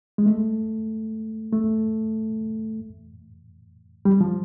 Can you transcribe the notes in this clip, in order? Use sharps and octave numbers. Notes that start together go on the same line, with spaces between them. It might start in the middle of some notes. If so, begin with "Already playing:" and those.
G#3
A3
A3
G3
F3